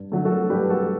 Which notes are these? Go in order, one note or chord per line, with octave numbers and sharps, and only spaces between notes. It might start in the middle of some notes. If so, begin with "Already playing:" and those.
Already playing: G2
D3 F#3 A3
F#4 A4
G2 G4 B4
F#4 A4